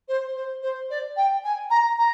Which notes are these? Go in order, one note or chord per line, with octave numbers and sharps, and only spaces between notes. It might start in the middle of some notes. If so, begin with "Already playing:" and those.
C5
C5
C5
D5
G5
G#5
A#5
A#5